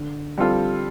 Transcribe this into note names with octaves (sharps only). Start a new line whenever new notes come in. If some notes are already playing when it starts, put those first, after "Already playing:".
Already playing: D3
G3 C4 F4 A4